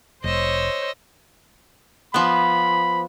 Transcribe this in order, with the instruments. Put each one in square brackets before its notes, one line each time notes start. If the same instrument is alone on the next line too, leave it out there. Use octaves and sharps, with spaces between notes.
[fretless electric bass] F1 [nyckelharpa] C5 C#5 [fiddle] D#5 E6
[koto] F3 B3 [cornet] B5